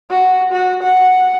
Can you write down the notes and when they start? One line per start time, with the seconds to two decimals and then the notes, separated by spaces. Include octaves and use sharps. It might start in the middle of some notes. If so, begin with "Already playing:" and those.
0.10 F#4
0.52 F#4
0.83 F#5